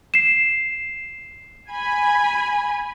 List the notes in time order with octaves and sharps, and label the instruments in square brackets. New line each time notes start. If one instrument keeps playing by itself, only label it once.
[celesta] C7 E7
[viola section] G#5 B5